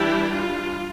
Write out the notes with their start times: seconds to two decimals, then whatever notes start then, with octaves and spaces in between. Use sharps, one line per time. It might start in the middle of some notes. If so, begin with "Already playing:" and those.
Already playing: E3 G3 D4 E4 G4
0.35 F4